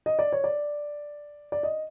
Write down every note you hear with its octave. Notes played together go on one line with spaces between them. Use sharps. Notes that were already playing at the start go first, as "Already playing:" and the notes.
D#5
D5
C#5
D5
D5
D#5